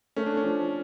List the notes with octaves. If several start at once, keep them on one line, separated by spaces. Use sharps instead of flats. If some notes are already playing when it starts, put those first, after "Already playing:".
A3 C#4
D4
C#4
F3